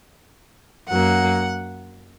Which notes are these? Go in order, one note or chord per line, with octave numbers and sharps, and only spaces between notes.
F#2 F#3 A#3 F#5